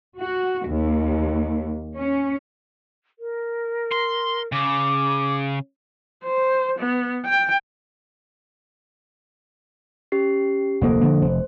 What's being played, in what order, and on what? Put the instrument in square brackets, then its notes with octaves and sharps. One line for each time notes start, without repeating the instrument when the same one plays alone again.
[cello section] F#4
D#2
C#4
[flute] A#4
[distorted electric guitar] C6
[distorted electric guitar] C#3 [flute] D6
[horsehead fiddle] C5
B3
G5
[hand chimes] C#4 G4 C7
[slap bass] F1 D2 A#3 [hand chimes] A4 C5 F#5
[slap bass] D3 F3 A#3
[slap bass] F1 [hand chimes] C5